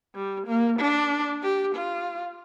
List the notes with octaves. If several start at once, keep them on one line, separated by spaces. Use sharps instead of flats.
G3
A#3
D4
G4
F4